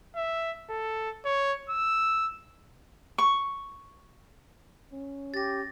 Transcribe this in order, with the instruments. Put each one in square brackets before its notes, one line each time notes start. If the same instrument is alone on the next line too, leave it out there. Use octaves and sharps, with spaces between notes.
[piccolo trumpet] E5
A4
C#5
E6
[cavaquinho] C#6
[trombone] C#4
[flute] G4 [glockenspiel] A6 A#6